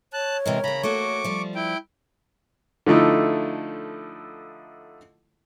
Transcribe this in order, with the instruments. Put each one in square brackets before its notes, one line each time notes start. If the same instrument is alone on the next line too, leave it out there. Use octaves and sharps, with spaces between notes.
[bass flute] C#5 [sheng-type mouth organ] A5 F#6
[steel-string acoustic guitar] C3 E3 G#3 [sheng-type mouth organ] A#4
[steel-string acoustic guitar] C#3 A#3 [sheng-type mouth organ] A#5 B5
[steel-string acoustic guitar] A3 A#3 F#4 [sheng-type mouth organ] C#6 D6
[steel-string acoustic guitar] F3 G3
[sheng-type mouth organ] E4 G5
[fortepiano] D3 F3 A3 D#4 E4